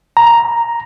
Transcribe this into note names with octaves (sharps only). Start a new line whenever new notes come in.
A#5